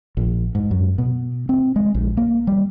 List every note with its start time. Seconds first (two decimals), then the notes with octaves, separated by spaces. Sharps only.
0.17 A#1
0.55 G#2
0.71 F#2
0.98 B2
1.49 C4
1.76 G#3
1.94 A#1
2.17 A#3
2.47 G3